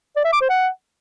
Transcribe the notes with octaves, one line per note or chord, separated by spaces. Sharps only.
D5
E5
D6
C5
F#5